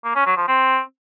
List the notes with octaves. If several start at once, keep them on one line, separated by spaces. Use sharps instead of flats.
A#3
C#4
F#3
F3
C4